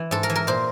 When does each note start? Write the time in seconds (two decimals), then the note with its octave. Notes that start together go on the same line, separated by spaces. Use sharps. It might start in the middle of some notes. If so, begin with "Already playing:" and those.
Already playing: E3
0.11 G#2 A4
0.23 A#4
0.30 E3
0.36 A#4
0.47 A#2 C5